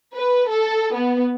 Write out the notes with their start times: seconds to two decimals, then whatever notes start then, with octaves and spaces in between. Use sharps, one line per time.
0.14 B4
0.49 A4
0.94 B3